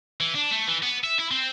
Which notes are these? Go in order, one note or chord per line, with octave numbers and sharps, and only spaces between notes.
E3
D4
A3
E3
B3
E5
E4
C4